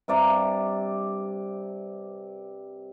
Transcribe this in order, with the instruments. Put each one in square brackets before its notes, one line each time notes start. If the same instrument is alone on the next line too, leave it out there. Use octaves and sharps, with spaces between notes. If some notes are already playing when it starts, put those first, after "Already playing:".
[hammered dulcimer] G2 C3 D5 A#5